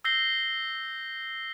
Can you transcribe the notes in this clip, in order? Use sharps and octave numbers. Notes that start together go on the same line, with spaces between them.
E6 G6 A#6 C7 G7